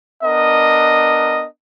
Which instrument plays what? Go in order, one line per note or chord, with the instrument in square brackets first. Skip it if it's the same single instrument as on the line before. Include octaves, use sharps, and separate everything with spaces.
[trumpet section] B3 D4 A#4 D#5